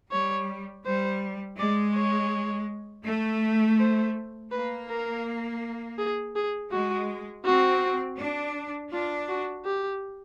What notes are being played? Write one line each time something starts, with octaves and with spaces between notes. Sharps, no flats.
G3 C#5
G3 C5
G#3 D5
C#5
A3
C5
A#3 B4
A#4
G#4
G#4
G#3 F#4
C4 F#4
D4
D4 F4
F#4
G4